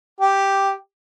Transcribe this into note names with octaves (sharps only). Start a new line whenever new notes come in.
G4